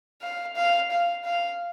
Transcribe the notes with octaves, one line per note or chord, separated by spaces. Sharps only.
F5
F5
F5
F5